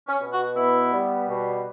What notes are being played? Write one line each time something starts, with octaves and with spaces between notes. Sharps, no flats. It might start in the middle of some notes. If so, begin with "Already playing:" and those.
C#4
B2
F#4
B3 E4
G3
B2